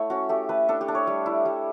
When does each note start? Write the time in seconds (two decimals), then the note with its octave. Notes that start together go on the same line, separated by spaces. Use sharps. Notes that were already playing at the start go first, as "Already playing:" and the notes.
Already playing: A3 E4 C#5 F#5
0.10 C#4 F#4
0.29 A3 G4
0.49 A3 B4
0.69 D4 A4
0.81 G4
0.88 D4
0.95 C#5
1.07 G3
1.26 E4
1.45 G3